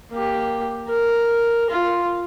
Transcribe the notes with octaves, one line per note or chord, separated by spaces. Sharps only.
A#3 G4
A#4
F4